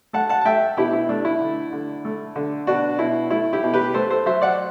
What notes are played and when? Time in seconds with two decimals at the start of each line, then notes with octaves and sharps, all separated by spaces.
0.13 A3 F#5 A5
0.29 F#5 A5
0.41 A5
0.45 A3 E5 G5
0.77 B2 E4 G4
0.93 E4
1.09 A3 D4
1.25 E4
1.41 D3
1.73 D3
2.05 A3
2.36 D3
2.67 B2 D4 F#4
2.99 B2 E4
3.30 A3 E4
3.53 E4 G4
3.63 B2
3.74 G4 B4
3.94 A3 A4 C5
4.10 A4 C5
4.26 F#3 C5 E5
4.41 D5 F#5